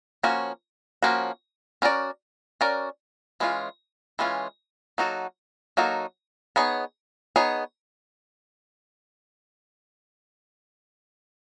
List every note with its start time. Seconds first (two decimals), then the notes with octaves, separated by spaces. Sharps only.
0.23 F3 A#3 C#4 F#4
1.03 F3 A#3 C#4 F#4
1.82 C#4 F#4 A#4 D5
2.61 C#4 F#4 A#4 D5
3.40 E3 G#3 C#4 F4
4.19 E3 G#3 C#4 F4
4.98 F#3 A#3 D#4 F#4 A4
5.77 F#3 A#3 D#4 F#4 A4
6.56 B3 D#4 G#4 C#5
7.36 B3 D#4 G#4 C#5